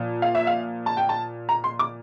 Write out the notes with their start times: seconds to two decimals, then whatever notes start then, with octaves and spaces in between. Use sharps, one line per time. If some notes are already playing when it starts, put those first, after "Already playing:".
Already playing: A#2 F3
0.22 F5
0.35 E5
0.47 F5
0.86 A5
0.97 G5
1.09 A5
1.49 A#5
1.64 C6
1.79 D6